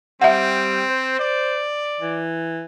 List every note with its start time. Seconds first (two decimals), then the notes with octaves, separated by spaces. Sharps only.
0.21 G3 C4 E5 F#5
0.89 C5
1.20 D5
2.00 E3